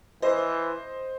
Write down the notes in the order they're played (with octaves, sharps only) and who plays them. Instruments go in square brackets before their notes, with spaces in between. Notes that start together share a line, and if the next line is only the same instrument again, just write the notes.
[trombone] E3 [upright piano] C5 D#5